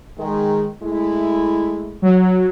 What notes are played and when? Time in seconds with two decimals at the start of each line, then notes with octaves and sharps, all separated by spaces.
0.18 D#3 G#3
0.83 G#3 A3 E4
2.02 F#3